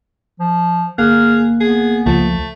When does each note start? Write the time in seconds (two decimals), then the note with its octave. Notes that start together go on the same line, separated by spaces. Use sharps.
0.40 F3
0.98 G1 A#3 G#4 F6 F#6
1.60 B3 G#4
2.06 C#2 F3 A3